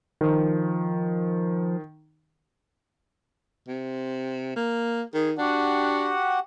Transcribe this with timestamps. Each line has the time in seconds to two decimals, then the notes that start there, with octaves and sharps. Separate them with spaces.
0.21 D#3 F3
3.68 C3
4.56 A#3
5.14 D#3 G#4
5.38 D4 F#4 G4 F#5